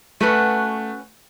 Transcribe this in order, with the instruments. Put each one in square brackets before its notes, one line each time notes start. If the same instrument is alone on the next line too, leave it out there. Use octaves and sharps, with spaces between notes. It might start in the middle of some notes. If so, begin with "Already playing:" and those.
[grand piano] A3 [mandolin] C#4 F#4 B4 F#5